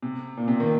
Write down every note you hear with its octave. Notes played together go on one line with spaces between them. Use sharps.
C3
A#2
C3
D#3